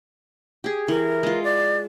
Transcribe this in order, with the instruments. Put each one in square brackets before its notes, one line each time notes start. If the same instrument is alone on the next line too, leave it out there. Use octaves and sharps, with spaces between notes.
[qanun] G4 G#4
[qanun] E3 [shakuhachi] A#4
[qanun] G#3 F4
[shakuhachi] D5